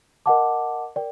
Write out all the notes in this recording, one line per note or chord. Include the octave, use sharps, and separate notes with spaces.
A#4 D#5 F#5 A5 D6
A#4 D5 G5